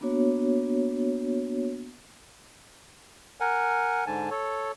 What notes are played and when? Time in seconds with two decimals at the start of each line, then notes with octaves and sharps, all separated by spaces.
0.01 A#3 B3 D4 F#4 C#5
3.40 A#4 F#5 G#5
4.07 G#2 D3 G#5 A5
4.31 A4 C#5